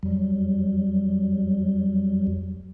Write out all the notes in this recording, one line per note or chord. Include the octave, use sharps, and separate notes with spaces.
F2 F#3 G3